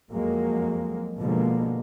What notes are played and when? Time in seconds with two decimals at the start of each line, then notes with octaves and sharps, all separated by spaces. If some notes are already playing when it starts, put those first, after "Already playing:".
0.11 F2 F#3 G#3 A#3
1.19 B2 D3 F3 G#3 A#3